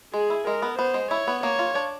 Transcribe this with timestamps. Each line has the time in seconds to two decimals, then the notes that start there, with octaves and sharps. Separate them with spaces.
0.14 G#3 G#4
0.30 E4
0.47 G#3 A#4
0.62 B3
0.78 B3 C5
0.94 G#3
1.11 E4 C#5
1.28 B3
1.43 A#3 C#5
1.59 F4
1.75 D4